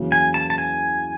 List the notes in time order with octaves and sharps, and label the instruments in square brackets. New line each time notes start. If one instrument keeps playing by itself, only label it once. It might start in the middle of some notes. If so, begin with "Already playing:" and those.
Already playing: [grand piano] E2 C#3 F#3 A#3
[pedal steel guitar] G#5
A5
A5
G#5